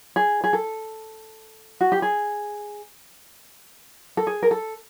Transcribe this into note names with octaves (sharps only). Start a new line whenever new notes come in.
G#4
G#4
A4
F#4
G4
G#4
A4
G#4
A#4
A4